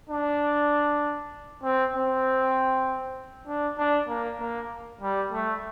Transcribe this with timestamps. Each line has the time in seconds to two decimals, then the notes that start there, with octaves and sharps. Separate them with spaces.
0.10 D4
1.63 C4
1.94 C4
3.48 D4
3.78 D4
4.08 A#3
4.40 A#3
5.01 G3
5.32 A3